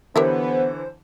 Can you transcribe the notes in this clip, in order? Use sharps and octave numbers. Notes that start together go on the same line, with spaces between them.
D3 E3 B3 G4 A#4 C5 C#5 E5